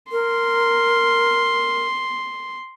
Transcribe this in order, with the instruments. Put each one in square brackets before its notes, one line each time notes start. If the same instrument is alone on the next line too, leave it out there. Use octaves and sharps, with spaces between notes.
[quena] A#4 [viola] C6